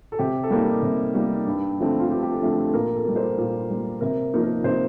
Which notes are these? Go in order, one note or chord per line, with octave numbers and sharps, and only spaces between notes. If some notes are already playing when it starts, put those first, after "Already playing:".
A4
C3 G4
A4
G3 A#3 D#4 G4
C3
G3 A#3 D#4
G2
D3 F3 A3 C4
F4
G2 G4
G4
A4
D3 F3 A3 C4
G4
A4
A#2 A#4
A4
G3 A#3
C5
A#2
G3 A#3
C3 A#4
F3 A#3 D#4
A#4
C3 C5